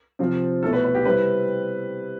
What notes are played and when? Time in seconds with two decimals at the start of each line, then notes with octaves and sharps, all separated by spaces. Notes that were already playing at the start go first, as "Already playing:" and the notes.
0.19 C3 F3 C4 F4
0.62 B2 A3 E4 A4
0.73 B4
0.84 B4
0.95 G4
1.05 C3 G3 C4 E4 B4